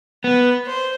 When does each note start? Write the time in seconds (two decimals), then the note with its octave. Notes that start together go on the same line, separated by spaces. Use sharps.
0.24 B3 B4
0.65 C5